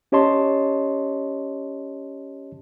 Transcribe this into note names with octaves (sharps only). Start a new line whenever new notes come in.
C#4 G4 C#5 D#5 A5 C6